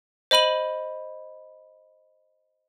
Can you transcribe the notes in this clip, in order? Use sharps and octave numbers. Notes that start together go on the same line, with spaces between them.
C5 D#5 B5 D#7 F#7